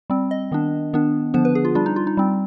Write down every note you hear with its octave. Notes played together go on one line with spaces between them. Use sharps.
G3 C4
D#5
D#3 B3 D4
D#3 B3 D4
D3 F3 B3 D4 C5
B4
G#4
F4
G3 D4 F4
D#4
F4
D#4
G3 C4